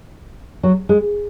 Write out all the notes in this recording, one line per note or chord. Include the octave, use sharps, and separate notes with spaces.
F#3
G#3